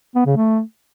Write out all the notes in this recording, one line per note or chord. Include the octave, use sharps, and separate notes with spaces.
B3
C#3
A3